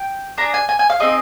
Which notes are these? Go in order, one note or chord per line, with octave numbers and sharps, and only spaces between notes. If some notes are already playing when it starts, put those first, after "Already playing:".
Already playing: G5
D4 G#4 A#5
G#5
G#5
G#5
F5
C4 D#4 G#4 D#5